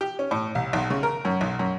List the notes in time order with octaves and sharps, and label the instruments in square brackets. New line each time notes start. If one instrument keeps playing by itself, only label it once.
[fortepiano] G4
C#4
A2
C2
B1
C#3
A#4
F#2
B1
F#2